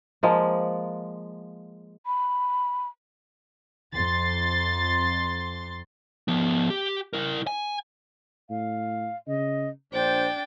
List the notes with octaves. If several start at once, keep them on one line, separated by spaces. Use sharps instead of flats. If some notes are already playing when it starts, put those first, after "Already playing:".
F3 G#3 A#3
B5
F2 C6 A6
F3 B3
G4
E4 A#4
G#5
A2 F5
C#3 D#5
A#1 D4 C5 G5 A6